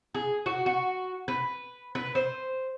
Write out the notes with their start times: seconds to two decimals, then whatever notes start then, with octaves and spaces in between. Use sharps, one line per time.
0.14 G#4
0.46 F#4
0.66 F#4
1.28 B4
1.95 B4
2.15 C5